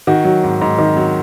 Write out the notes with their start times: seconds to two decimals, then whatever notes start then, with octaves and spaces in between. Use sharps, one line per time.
0.07 D#3 F#4
0.25 F#3
0.43 G#2
0.61 G#2
0.78 D#3
0.96 F#3